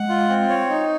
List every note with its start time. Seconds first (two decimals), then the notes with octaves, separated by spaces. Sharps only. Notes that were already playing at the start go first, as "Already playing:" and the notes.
Already playing: G#3 F#5
0.09 F4
0.29 C4
0.49 C#5
0.69 D#4